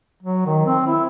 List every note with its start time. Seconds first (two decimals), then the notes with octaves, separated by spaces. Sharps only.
0.23 F#3
0.46 D#3
0.66 C4
0.87 E4